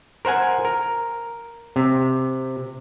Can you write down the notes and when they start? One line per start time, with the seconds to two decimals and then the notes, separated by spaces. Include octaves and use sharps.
0.25 A#4 C5 F#5 G#5
0.65 A#4
1.76 C3